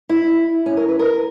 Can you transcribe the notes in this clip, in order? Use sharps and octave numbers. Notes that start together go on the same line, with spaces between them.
E4
C#4
A#4
B4
A#4